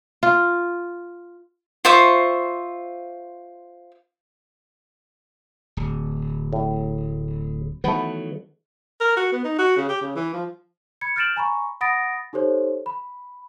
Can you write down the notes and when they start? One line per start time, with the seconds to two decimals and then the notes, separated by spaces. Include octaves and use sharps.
0.23 F4
1.85 F4 C5 E5 C#6
5.77 D1
6.53 A2
7.84 D#3 E3 F#3 A3 B3
9.01 A#4
9.17 F#4
9.32 B3
9.44 D#4
9.58 F#4
9.77 C#3
9.89 G4
10.01 C#3
10.16 E3
10.33 F3
11.01 B5 G#6 C#7
11.16 F6 G6 A6 D7 E7 F#7
11.37 G#5 A#5 B5 C#6
11.81 F#5 B5 D#6 A6 A#6 D7
12.33 D#4 G4 A4 C5 C#5
12.86 B5